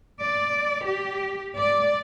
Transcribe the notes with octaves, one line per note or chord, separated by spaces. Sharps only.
D5
G4
D5